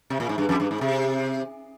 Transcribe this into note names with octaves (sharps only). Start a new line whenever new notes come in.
C3
A#2
G#2
G2
F2
G2
G#2
C3